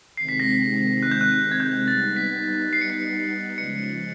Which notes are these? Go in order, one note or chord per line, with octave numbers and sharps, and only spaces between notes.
C3 D#3 G#3 C4 C7
B6
A#6
B6
F#6
G6
F#6
F#6
G#6
G6
G3 B3 D#4 A6
B6
C7
C#7
C7
C#3 F3 G#3 C#7